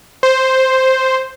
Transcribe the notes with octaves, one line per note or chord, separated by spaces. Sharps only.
C5